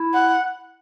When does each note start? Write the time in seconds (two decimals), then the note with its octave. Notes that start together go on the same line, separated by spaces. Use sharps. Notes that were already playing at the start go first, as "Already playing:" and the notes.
Already playing: E4
0.14 F#5